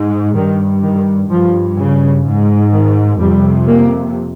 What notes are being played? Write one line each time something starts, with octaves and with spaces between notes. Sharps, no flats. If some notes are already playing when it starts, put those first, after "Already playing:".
Already playing: G#2
G2 D#3
D#3
G2 F3
C#3
G#2
D#3
F2 C3 G3
A#3